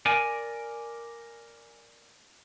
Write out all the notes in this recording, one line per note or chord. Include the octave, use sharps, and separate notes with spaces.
A#4 D5 G#5